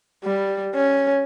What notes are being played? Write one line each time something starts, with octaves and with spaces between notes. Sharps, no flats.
G3
C#4